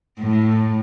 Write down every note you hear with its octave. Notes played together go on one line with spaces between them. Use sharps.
A2